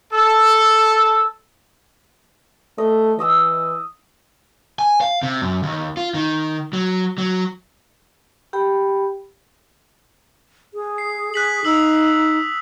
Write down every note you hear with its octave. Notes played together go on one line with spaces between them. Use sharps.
A4 E6
A3 D#5
E3 D#5 D#6 E6
G#5
F5
C3
F#2
D#2
F4
D#3
F#3
F#3
G4 G5 B5
G#4
C7
G#4 F#6 B6 F#7
D#4 D#6 E6 F#7